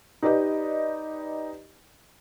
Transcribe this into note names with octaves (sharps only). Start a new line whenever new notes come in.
D#4 G4 B4 D5 D#5